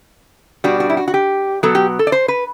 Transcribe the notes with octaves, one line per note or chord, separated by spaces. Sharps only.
B2 G3 D4 F#4
F#4
E4
F#4
F#4
G4
B2 F#3 B3 A4
G4
A4
D5
C5
B4